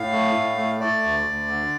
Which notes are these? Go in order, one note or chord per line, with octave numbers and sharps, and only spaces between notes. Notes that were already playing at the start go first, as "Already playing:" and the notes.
Already playing: A2 F5
A3
A2
A3
A3 D5
D2
D2
D3